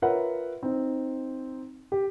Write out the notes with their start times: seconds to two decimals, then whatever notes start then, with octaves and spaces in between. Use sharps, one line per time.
0.02 F4 A#4 B4 C#5 E5 F#5
0.63 C4 D#4
1.92 G4